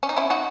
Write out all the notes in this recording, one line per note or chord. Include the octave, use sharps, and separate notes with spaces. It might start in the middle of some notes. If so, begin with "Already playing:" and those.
C#4
D#4
C#4 E4
D#4 F#4